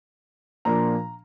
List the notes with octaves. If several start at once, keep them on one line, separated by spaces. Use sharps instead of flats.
A#2 F3 A#3 D4 A#5